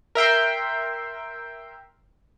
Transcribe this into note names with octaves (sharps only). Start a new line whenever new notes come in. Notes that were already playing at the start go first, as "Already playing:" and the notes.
A#4 E5 G5 C6